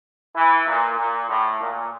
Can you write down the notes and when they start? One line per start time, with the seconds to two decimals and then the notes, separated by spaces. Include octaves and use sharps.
0.36 E3
0.67 A#2
0.98 A#2
1.29 A2
1.61 A#2